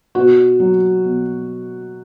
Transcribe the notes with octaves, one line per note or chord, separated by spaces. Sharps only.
B2 F#4
F#3
B2